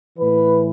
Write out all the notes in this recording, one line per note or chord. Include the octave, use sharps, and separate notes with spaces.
A2 E3 B4